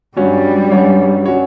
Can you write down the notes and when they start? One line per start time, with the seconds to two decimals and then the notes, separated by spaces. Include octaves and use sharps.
0.16 G2 F#3 G3 C#4 F#4 C#5
0.71 G2 F#3 C#4 F#4 C#5
1.26 F#3 C#4 F#4 C#5